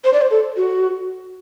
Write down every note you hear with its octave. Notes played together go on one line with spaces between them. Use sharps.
C5
D5
C5
A4
F#4